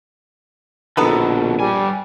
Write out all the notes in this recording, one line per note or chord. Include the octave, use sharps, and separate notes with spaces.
A#1 B2 D3 B3 D#4 A4
G2 G3 G#5